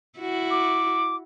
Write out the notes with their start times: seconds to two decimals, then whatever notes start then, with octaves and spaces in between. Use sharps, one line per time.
0.19 E4 F#4
0.51 D6